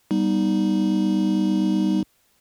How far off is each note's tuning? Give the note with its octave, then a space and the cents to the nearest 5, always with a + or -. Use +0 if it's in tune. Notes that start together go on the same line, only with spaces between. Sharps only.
G3 -5 B3 -20 D#4 +0